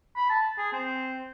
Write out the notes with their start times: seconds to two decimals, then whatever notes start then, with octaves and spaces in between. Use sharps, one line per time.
0.16 B5
0.30 A5
0.58 G#4
0.73 C4